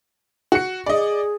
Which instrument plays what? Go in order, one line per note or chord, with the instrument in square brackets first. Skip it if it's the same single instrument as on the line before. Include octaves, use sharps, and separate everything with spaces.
[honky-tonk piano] F#4 C#7
[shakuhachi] G#4 [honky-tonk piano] D5 D#5